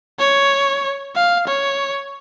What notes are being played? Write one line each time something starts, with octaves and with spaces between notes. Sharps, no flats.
C#5
F5
C#5